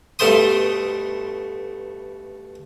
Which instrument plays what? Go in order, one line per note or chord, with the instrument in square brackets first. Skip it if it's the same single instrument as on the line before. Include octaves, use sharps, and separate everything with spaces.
[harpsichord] G2 B2 A3 C5 C6 D#6